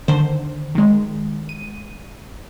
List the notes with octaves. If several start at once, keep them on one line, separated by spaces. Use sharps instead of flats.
D3 D#3 C5
D#3 G#3
D#7